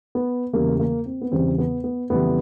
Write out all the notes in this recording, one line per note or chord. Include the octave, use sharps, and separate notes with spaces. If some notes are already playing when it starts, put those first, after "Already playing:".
B3
E2 C#3 E3 G3 A#3
A#3
C4
B3
E2 C#3 E3 G3 C4
B3
B3
F2 C#3 E3 G3 B3